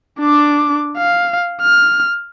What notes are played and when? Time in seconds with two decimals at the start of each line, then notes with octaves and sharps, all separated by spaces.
0.20 D4 D6
0.97 F5
1.62 F6